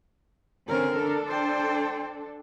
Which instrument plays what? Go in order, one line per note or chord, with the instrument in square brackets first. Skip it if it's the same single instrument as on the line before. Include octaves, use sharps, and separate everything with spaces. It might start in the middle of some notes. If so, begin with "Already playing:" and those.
[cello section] D3 C4 C#4 [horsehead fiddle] A#4
[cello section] D4 A4
[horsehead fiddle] C5 G5